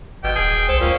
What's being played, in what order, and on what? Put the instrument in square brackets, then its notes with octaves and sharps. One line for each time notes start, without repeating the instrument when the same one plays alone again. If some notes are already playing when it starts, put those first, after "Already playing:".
[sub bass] G#1 [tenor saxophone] B2 [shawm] G5
[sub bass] D#1 [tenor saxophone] G#4
[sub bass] C2 [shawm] A4 [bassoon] C5
[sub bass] D2 [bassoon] A#2 [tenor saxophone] A#3 [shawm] C#4